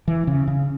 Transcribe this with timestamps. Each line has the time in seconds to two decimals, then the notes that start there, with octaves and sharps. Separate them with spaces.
0.08 E3
0.27 C#3
0.48 C#3